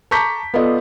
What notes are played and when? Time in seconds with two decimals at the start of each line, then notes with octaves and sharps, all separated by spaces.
0.11 A5 A#5 C#6 D6 G6 B6
0.54 B3 F4 A4 D5 D#5